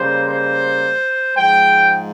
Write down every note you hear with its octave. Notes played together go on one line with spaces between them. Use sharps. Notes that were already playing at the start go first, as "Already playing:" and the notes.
Already playing: C#3 G3 A#3 C5
C5
G#2 F3 G#3 G5